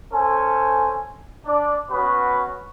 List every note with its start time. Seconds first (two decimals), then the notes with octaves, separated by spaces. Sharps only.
0.12 C#4 A4 C5 G#5
1.46 D4 D5
1.91 B3 C#4 F#4 B4